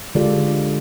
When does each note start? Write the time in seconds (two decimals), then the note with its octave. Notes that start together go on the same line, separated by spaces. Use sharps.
0.15 D3 G#3 F4 G4 A4 D5